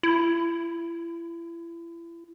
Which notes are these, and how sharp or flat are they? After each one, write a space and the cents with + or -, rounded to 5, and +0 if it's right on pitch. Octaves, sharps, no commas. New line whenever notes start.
E4 +35